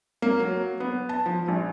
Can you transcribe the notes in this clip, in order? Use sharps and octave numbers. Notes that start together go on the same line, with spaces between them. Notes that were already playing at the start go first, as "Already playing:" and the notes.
A#3
F#3
B3
A5
F3
A#1